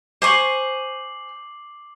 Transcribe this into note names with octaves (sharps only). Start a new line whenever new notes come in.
C5 G#5 C#6 D6 C7 F#7